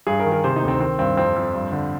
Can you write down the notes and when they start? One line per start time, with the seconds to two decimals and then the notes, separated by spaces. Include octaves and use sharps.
0.07 G2 G#4
0.20 A#4
0.26 D#3
0.32 A#4
0.44 C3 C5
0.56 D#4
0.63 D2
0.68 C4
0.80 D#3 C4
0.99 G2 C4
1.17 F2 C4
1.36 F2
1.54 G2
1.72 D3